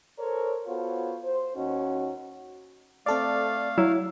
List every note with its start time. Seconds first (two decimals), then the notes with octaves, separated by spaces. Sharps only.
0.19 A4 A#4 C5 C#5
0.67 B3 F4 F#4 A4 C5 C#5
1.24 C5
1.56 D#2 C#4 D#4 F#4
3.06 A3 C4 A4 D5 F5
3.78 F#3 E4 F#5